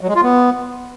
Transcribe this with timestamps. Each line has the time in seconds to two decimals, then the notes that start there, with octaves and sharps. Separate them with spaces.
0.01 F#3
0.08 G#3
0.15 F4
0.23 B3